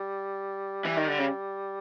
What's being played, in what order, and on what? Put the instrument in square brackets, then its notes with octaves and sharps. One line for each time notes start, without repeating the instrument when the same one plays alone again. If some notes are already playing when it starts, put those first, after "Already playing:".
Already playing: [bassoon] G3
[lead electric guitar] E3
D#3
D3
C#3